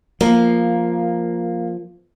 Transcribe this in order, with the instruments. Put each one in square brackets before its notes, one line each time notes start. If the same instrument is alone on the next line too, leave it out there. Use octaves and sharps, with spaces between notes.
[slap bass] F3 [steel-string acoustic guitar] A#3